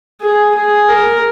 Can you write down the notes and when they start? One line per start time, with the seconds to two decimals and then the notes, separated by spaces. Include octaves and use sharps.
0.21 G#4
0.55 G#4
0.89 A#4